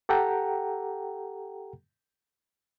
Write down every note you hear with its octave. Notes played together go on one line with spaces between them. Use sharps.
G4 A4 F#5 G5 A#5